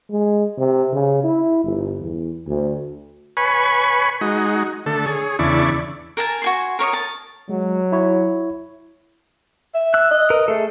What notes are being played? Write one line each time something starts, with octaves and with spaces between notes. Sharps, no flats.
G#3
C3
C#3
E4
G1
E2
D2
B4 C#5 G#5 B5 C#6
G#3 D#4 F#4
D3 A3 A4
G#4 C#5
E2 C#3 D4 E4 D5 C#6
A#4 G#5 A5
F#4 G#5 C6
A#4 C#5 B5 D#6
A5
F#3 G#3
E4 C#5
E5
E6 F#6
D#5
A#4 B4
A3 G#4 A4